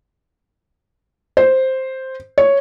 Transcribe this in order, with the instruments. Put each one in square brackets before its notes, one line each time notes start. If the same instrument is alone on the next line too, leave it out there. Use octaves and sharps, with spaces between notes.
[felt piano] C5
C#5